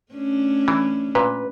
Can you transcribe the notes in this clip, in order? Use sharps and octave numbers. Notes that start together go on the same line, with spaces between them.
A3 C#4 D4
E3
A#2 B4